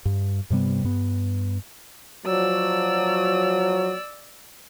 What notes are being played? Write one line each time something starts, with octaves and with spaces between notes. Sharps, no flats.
G2
G2 C3 G3 B3
G2 B3
F3 F#3 D5 E6